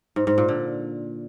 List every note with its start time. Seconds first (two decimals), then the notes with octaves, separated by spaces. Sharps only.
0.16 G#2
0.27 G#2
0.38 A#2
0.48 D3